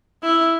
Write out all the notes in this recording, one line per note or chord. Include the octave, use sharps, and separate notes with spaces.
E4